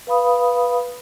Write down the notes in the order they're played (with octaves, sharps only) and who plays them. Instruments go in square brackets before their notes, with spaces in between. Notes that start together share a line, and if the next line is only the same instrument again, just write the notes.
[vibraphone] B4 F5 B5 D#6